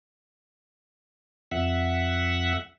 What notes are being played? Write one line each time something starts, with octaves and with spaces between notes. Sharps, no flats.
F2 E5 F#5